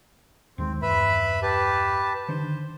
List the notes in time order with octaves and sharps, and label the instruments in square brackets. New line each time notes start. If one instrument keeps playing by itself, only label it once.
[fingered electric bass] D#2 D#3 G#3 [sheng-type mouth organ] C4
[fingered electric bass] E1 G2 [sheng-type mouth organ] B4 E5 B5
[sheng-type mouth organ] G4 B4 A5
[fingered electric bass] D3 D#3 D4 [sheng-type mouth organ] C5